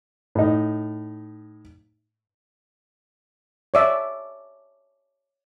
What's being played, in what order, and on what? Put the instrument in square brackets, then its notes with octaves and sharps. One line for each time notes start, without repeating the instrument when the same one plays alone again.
[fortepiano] A2 D#4
[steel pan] C#5 D5 E5